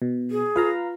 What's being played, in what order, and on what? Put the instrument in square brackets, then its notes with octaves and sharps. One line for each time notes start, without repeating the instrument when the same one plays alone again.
[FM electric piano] B2
[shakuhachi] G#4
[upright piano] F4 [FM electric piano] B4 F5 A#5